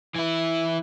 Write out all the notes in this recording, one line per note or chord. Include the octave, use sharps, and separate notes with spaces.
E3 E4